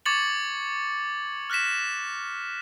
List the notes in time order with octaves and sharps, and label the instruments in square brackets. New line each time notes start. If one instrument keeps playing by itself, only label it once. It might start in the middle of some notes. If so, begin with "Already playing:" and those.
[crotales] C#6 D6 G#6 A6 C#7 F#7
F6 F#6 A#6 B6 E7